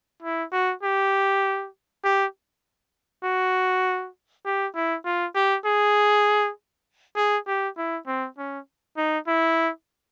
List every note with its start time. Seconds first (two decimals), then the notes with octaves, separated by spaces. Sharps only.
0.23 E4
0.53 F#4
0.83 G4
2.05 G4
3.24 F#4
4.46 G4
4.76 E4
5.06 F4
5.35 G4
5.66 G#4
7.17 G#4
7.48 G4
7.77 E4
8.07 C4
8.38 C#4
8.97 D#4
9.28 E4